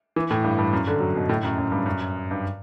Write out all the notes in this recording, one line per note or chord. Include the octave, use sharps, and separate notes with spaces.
E3
A2
G2
G2
F#2
D3
F#3
B2
A2
F#2
F#2
G2
F#2
G2